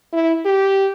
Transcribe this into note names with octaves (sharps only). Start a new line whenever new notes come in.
E4
G4